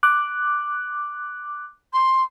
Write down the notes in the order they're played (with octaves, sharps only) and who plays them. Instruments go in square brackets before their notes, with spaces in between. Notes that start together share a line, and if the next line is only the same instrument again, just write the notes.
[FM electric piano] D6 F#6
[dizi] C6